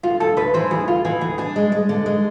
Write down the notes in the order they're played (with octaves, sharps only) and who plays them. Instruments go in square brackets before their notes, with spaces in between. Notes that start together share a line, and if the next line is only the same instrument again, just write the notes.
[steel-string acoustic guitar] D2 [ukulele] F4
[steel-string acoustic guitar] D2 [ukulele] A4
[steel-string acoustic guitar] D2 [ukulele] B4
[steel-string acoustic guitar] E3 [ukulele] C5
[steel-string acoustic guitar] D2 [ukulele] G#4
[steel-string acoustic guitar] D2 [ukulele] F4
[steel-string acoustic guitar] E3 [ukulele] G#4
[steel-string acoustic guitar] D2 [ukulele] G#4
[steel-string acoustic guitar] D4 [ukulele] G#4
[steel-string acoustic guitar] G#3
G#3
D3
G#3